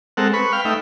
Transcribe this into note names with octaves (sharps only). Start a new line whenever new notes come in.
G#3 C4 A4 A#4 F#5
B4 B5 C#6
F5 G5 B5 F6
A3 D#4 E5 G5